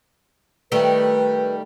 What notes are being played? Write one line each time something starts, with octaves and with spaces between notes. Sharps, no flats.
D#3 G3 A3 B4